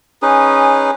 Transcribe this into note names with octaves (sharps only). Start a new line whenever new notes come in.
C#4 D#4 G#4 B4